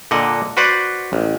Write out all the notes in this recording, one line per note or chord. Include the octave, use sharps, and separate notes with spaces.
A#2 D3 D#5 F#5
F#4 B4 C5 D5 F#5
A1